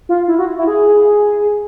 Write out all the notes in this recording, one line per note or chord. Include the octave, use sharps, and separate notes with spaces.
F4
E4
F#4
E4
G#4